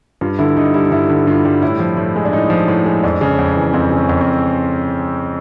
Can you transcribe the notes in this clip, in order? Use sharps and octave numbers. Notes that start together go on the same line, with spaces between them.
G2 F4
D3 E4
G2 D#4
G3 E4
G2 E4
D3
G2 F4
G3
A2 E4
F3
A2
G#3
D4
A2 D#4
F3
A2
G#3
F2 D4
C#3
F2
E3
F2 C4
C#3
C#4
F2
C4